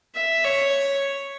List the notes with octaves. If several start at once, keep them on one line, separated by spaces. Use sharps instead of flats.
E5
C#5